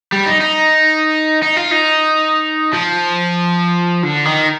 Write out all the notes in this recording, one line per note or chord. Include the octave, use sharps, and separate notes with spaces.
G3
D#4
D#4
D#4
F4
D#4
F3
D3
D#3